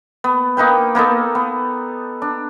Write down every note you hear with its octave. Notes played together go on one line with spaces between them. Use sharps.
B3
A#3 D#4 B4 G5
A#3 B3 D#4 A4
B3
D4